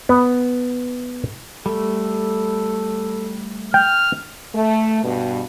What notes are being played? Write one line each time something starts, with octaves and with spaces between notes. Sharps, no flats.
B3
G3 A3 A4
G5 F6
A3
G2 B2